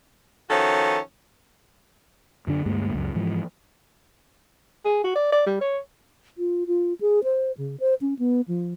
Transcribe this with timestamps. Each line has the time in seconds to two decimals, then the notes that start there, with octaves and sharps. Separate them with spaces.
0.50 D#3 F3 C#4 F#4 A4
2.47 F#2 D3 D4
2.66 D2 G2 G#3 A#3
2.94 C#2 F#2
3.15 G#2 E3 F3
4.85 G#4
5.04 F#4
5.16 D5
5.32 D5
5.46 G3
5.61 C#5
6.38 F4
6.67 F4
7.01 G#4
7.24 C5
7.58 C#3
7.80 C5
8.01 C#4
8.19 B3
8.48 F3